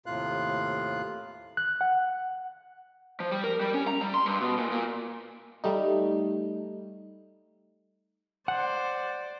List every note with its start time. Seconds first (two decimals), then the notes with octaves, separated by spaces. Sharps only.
0.06 D#2 A2 C3 F4 F5 F#6
1.57 F#6
1.81 F#5
3.20 F3
3.32 G3
3.44 A#4
3.61 G3
3.74 C#4
3.87 A#5
4.01 G3
4.14 C6
4.26 G2
4.41 B2
4.57 A#2
4.71 A#2
5.64 G3 A3 D#4
8.48 C5 D5 F#5